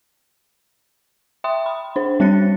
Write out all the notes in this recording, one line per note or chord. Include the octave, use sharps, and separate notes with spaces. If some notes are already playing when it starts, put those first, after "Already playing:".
E5 G5 C6 D#6
B5
D4 C5
G3 C4 C#5 F#6 A6 C#7